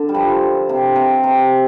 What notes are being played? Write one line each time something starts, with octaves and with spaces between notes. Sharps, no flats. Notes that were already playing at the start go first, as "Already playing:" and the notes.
Already playing: D3
G3
F3
C3
C3
C3